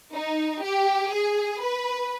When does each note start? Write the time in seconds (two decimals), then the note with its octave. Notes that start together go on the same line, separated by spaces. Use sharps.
0.14 D#4
0.63 G4
1.11 G#4
1.60 B4